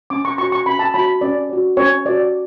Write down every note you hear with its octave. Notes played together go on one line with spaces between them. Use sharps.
C#4 D6
C#6
F#4 C#5 C#6
C#6
C#4 B5
A5
F#4 C#5 B5
C#4 D5
F#4 C#5
C#4 C#5
F#4 C#5 D5